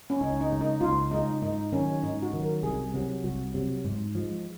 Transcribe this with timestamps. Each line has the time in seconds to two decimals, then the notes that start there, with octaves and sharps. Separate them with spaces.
0.10 C#4
0.21 C#2 D#4
0.41 D#4
0.52 C#3 G#3
0.61 D#4
0.81 C#2 F4
1.11 C#3 G#3 D#4
1.42 G#2 D#4
1.72 D#3 F#3 C#4
2.03 G#2 D#4
2.22 F#4
2.33 D#3 F#3
2.43 A#4
2.63 C2 G#4
2.94 C3 F#3
3.24 C2 F#4
3.54 C3 F#3
3.85 G#2
4.15 F3 G#3